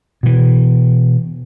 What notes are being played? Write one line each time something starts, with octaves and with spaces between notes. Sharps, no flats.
B2 E3